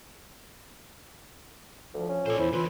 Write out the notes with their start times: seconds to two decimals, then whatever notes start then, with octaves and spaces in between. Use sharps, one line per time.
1.94 D2 F3
2.09 C#4
2.26 A#2 A4 C5 D5
2.38 E2 E4 C5
2.53 D3 E3 F4 B4